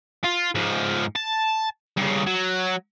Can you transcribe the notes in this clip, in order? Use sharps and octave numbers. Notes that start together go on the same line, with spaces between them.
F4
G#2 F3
A5
G2 C#3
F#3